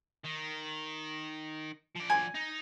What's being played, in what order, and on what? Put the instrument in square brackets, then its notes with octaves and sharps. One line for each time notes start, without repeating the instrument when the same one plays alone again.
[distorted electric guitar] D#3
F3 D5
[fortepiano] G#5
[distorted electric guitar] D#4